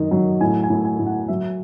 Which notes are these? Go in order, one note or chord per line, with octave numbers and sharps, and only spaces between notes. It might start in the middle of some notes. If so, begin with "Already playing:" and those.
Already playing: F#2 D#3 D#5
F#3
A2 G#5
G#5
A2
G#5
A2
F#5
F#3 E5